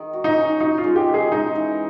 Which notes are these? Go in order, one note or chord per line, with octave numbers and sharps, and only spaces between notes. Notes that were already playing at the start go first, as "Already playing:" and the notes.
Already playing: D#3
F#4
D#4
C#4
D#4 F#4
F4
G#3
G4
D#3
G#4
G#3 D#4
E3